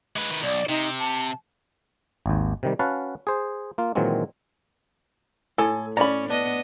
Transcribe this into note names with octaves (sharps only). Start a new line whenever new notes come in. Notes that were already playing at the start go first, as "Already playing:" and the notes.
G#3 B4
D#3 B4
B1 D5
C3 D#4
A5
G#1 D#2
C3 D#3 G3
C#4 F#4 B4 F5 F#5 A5
G#4 C5
A#3 F4
A#2 D#3 E3 F#3 G#3 C4
A2 A4 G#5
C#4 D5 A#5 B5
B3 D4 D#5